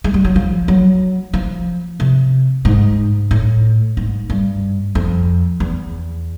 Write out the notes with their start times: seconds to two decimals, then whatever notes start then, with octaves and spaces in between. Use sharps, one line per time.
0.04 G#3
0.14 G3
0.25 F#3
0.36 F3
0.68 F#3
1.33 F3
2.00 C3
2.65 G#2
3.31 A2
3.97 G#2
4.30 G2
4.95 F2
5.60 E2